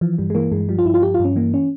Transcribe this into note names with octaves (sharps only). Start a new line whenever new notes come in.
E3 F3
G2 G3
G#3
E3 A#3
G2 G#3
F3 G3
F4
G2 E4
F4
F3 G4
F4
G2
C#4
E3 A#3
C#4